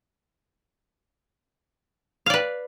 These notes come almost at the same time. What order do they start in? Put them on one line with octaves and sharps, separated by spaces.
F5 D5 B4